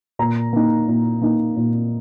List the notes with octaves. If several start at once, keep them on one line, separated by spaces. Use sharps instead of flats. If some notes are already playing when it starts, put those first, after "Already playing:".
A#2 A#5
A#3 D#4
A#2
A#3 D#4
A#2